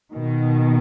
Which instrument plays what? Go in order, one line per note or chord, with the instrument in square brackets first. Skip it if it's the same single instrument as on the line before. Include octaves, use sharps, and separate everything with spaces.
[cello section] B2 D#3